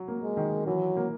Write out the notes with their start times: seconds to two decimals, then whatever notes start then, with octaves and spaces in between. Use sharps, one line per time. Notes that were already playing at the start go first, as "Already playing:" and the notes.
Already playing: F#3
0.08 A#3
0.22 G#3
0.37 D#3
0.67 E3 F#3
0.97 A#3